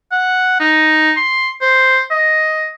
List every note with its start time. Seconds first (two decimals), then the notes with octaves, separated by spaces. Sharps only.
0.12 F#5
0.60 D#4
1.16 C6
1.61 C5
2.11 D#5